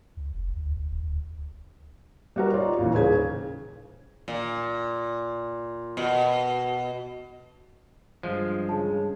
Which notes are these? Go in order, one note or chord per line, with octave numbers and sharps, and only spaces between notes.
C#2
F1
D2
D2
D1
D2
G3 F#4 A#4
D#4 F4 C#5 D5
D#2 A#2 E3
D#1 D#2 C#3 G#6
A#2
B2
G2 F3 G#3
C#3 A5